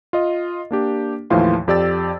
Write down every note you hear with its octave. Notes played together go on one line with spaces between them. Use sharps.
F4 D#5
A#3 D4 G4
D#2 A2 E3 F3 F5 C6
F2 G4 D5 E6 A6